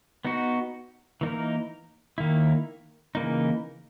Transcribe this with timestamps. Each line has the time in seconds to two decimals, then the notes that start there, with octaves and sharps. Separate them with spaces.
0.25 B3 D#4 F#4
1.21 E3 A#3 D#4 A#4
2.18 D#3 A#3 E4
3.15 C#3 E3 A#3 D#4